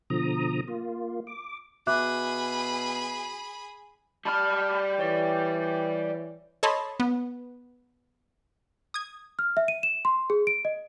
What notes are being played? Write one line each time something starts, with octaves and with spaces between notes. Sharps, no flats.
B2 D3 F3 A#5 D#6
A#3 F4
D6
B2 G#4 E5 B5 D6 F#6
G3 A5 B5 F6
E3 C#5 D5
A4 C#5 D#5 A5 B5 C6
B3
D#6 G#6
F6
E5
D#7
E7
C6
G#4
D7
D#5